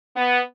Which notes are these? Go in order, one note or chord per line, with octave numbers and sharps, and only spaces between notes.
B3